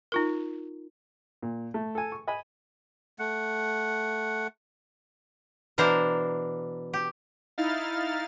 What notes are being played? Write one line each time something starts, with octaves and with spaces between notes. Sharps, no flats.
D#4 F4 A#4
A#2
A3
A4 G#5
C#6
D#5 G#5 B5
A3 F#5
B2 E3 D4 A#4 C5 A#5
G4
D#4 E4 F5 F6 A6